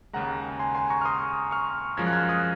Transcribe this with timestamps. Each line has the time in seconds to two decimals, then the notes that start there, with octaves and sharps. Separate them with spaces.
0.13 D#2 C#3 G#3 F#5 A#5
0.59 G#5 C6
0.75 G#5 C6
0.90 A#5 C#6
1.01 F6
1.05 C6 D#6
1.51 C#6 F6
1.97 F#2 F3 G#3 F6 G#6
2.07 F#6
2.13 F6 G#6
2.29 D#6 F#6